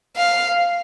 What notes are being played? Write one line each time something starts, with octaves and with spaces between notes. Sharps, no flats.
F5